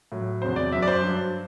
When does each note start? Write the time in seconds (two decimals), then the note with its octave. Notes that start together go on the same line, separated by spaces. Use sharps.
0.12 A2 F#3
0.41 F#3 C5
0.44 E2 C3
0.56 D5
0.71 F#2 F#3 E5
0.82 D5
0.87 C5
1.02 G2 F#3